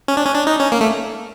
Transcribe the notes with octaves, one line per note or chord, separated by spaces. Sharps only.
C#4
D4
C#4
D4
D#4
C#4
A#3
A3